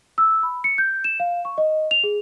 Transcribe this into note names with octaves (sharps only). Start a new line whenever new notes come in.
E6
B5
C#7
G6
E7
F5
C#6
D#5
F7
G#4